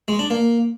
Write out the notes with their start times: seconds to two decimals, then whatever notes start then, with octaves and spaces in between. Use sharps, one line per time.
0.08 G#3
0.19 D4
0.30 A#3